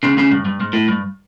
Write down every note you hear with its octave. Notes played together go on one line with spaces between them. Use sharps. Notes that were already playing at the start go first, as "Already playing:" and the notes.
C#2 C#3
C#2 C#3
G2
G2
G#2
A2
G2